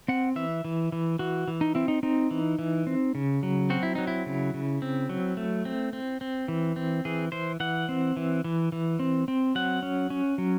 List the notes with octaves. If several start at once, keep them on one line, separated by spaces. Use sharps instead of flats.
C4 F#5
E3 E5
E3
E3
E3 F#4
E3
D#4
C4 E4
D#4
C4 D#4
E3
E3
C4
C#3
F#3
C4 F#4
E4
F#3 D#4
E4
C#3
C#3
C4
F#3
A3
C4
C4
C4
E3
C4
E3 G#4
E3 C5
E3 F#5
C4
E3
E3
E3
C4
C4
F#3 F#5
C#4
C#4
F#3